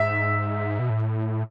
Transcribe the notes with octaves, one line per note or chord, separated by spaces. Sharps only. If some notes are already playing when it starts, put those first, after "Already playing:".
Already playing: G#2 E5
B2
A2